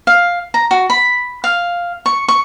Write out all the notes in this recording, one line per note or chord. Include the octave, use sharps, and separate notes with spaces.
F5
A#5
F#4
B5
F5
C#6
C#6